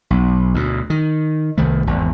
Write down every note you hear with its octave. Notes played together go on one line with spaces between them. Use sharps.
B1
D2 B2
D#3
C2 D#3 A3
G#1 E2